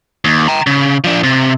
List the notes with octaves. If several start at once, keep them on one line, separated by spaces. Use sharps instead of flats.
D#2
G5 A#5
C#3
F3 D4
C3